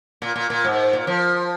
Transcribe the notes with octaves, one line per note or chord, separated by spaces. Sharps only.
A#2
A#2
A#2
G#2
A#2
F3